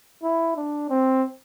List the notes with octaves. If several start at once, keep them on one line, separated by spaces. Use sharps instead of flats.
E4
D4
C4